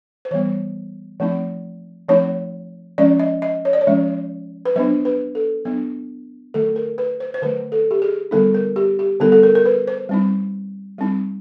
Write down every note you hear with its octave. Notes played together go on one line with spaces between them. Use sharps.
C5
E3 G3 B3 C#5
F3 A3 C4 D#4
F3 A3 C4 D#4 C#5
F3 G#3 C#4 D5
D#5
D#5
C#5
D5
C#5
F3 G#3 C#4
B4
F#3 B3 D4 C5
B4
A4
F#3 B3 D4
D3 F#3 A3 A4
A#4
B4
C5
C5
D3 F#3 A3 B4
A4
G4
G#4
D3 G3 B3 D#4 A4
A#4
G4
G4
D3 G3 B3 D#4 A4
A4
A#4
A#4
B4
C5
G3 C4 D#4
G3 C4 D#4